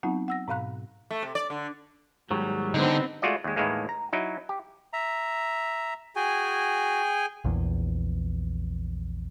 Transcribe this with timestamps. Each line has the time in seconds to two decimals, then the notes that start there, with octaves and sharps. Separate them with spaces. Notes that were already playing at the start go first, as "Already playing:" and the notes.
0.03 F#3 B3 C4 D#4 F4 F#5
0.28 F#5 E6 A#6
0.48 G#2 B2 F5 B5 F#6
1.11 A3
1.23 C3
1.35 D5
1.50 D3
2.31 D#2 G#2 F#3 G3
2.74 D3 B3 C4 D#4
3.22 G#3 A3 F4 F#4 D5 D#5
3.44 D#2 G#3
3.56 D#2 A2 D#3 E3 G#3 A#3
3.89 A#5
4.13 F#3 D#4 E4
4.49 G4
4.93 E5 A#5
6.16 F#4 G#4 G5 G#5
7.45 A#1 E2